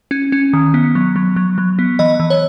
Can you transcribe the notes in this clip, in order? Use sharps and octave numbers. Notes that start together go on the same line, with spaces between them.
C#4
C#4
D#3
B3
F#3
F#3
F#3
F#3
B3
E3 D#5
E3
C#5